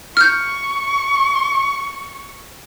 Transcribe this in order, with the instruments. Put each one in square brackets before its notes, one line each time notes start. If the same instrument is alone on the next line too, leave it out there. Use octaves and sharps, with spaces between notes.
[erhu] C#6 [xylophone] F6 G6